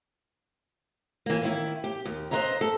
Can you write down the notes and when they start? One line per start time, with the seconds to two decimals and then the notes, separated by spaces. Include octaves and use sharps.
1.26 E3 A#3
1.43 D#3 E4
1.84 G4
2.05 D#2
2.31 B4 C5 D#5 E5 A#5
2.61 A4